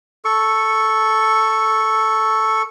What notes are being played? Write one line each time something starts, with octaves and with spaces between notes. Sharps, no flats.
A4 C#6